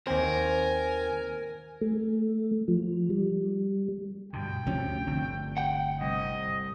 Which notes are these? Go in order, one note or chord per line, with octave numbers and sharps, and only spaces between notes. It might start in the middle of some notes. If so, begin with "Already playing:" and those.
D#2 C4 A#4 C5 G#5
A3
F3
G3
G2 B2 D3 G5
D2 C3 F3 C#4
G1 D3 A3 C4
F#5 G5
C2 D#5